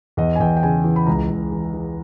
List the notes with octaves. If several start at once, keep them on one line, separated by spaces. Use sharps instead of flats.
E2 D#5
G#5
E2 G5
G5
C#3 G#5
E3
B5
C#2 A#5
C#2
E3
E3